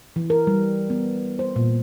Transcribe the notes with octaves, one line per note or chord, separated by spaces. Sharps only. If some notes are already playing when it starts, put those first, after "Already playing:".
E3
A#4
G3
B3
C5
A#2